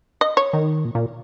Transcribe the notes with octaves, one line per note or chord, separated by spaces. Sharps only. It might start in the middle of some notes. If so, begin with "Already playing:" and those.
D#5
C#5
D#3
A#2
A#2